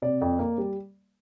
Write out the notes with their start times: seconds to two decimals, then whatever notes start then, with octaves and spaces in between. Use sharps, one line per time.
0.02 C3 D5
0.21 F2
0.39 A#3
0.58 G3